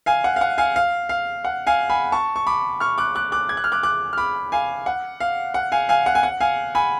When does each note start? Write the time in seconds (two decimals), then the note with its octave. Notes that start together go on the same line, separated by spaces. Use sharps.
0.06 F5 G#5
0.24 F#5
0.36 F5
0.41 F#5
0.58 F5 G#5
0.76 F5
1.09 F5
1.44 F#5
1.67 F5 G#5
1.90 G#5 B5
2.12 A5 C#6
2.36 C#6
2.47 B5 D6
2.80 C#6 F6
2.98 D6 F#6
3.15 D6 F#6
3.32 D6 F#6
3.49 G#6
3.57 F#6
3.64 F6
3.72 D6 F#6
3.83 D6 F#6
4.13 F6
4.17 B5 D6
4.52 F5 G#5
4.86 F#5
5.20 F5
5.54 F#5
5.72 F5 G#5
5.89 F5 G#5
6.06 F#5
6.15 G#5
6.23 F#5
6.40 F5 G#5
6.75 G#5 B5